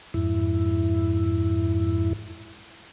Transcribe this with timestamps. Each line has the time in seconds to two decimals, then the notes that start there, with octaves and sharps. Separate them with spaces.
0.14 F2 G#2 E4